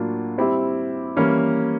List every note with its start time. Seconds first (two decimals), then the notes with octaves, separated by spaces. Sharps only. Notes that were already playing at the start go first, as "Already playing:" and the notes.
Already playing: A2 F#3 A#3 D4 F4
0.38 G3 C4 E4 G4
1.17 E3 G3 A#3 C#4